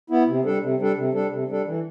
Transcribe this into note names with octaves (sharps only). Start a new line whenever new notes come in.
B3 E4
C3
G3 D4 A4
C3
G3 D4 A4
C3
G3 D4 A4
C3
G3 D4 A4
E3